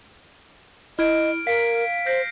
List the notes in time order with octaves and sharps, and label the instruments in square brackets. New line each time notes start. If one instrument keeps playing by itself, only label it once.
[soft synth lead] E4 [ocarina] D#5 [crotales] F6 G#6 D7
[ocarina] A#4 [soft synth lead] F5 [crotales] B6 D7
[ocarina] C5 [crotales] G6 A#6 C7